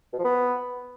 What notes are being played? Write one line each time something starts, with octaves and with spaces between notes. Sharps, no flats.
B2
F3
B3